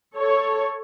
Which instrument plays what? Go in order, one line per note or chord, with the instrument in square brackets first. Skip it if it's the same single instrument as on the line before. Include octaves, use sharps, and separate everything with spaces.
[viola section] A4 C#5